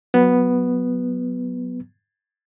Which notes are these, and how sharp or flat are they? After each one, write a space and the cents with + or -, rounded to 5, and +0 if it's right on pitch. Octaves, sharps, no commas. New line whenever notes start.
F#3 -5 B3 +0